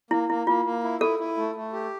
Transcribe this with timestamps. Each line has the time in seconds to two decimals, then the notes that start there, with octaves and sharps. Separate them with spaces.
0.11 A#3 E4
0.29 A#3 E4
0.47 A#3 F4
0.65 A#3
0.84 E4
1.01 E4 A4
1.19 E4
1.37 A3
1.55 A3
1.73 G4